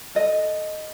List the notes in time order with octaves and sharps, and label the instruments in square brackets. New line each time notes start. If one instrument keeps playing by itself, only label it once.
[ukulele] A4 D#5